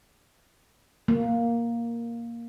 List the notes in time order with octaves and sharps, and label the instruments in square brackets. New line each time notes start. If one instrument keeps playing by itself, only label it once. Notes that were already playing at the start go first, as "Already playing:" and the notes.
[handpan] A#3